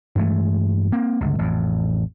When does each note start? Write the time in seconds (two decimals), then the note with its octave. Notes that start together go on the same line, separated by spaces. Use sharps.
0.15 G2 E3 G#3 A3
0.92 A#3 C4
1.21 G1 C#2
1.39 A1 F2